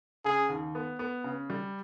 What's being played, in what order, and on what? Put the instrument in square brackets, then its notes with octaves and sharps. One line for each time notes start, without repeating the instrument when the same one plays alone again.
[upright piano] C#3 [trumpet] G#4
[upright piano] D#2
B3
B3
C#3
G3